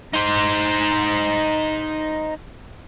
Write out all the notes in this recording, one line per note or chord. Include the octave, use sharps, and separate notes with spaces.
D#4 C5